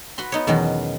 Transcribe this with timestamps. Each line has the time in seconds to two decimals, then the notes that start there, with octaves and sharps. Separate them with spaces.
0.18 F#4 B4 B5 C6
0.32 B3 D#4 C#5
0.47 E2 B2 D#3 F#3 C#4 F#4